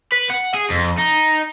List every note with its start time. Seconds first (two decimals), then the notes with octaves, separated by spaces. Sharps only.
0.12 B4
0.30 F#5
0.54 G#4
0.70 F2
0.99 D#4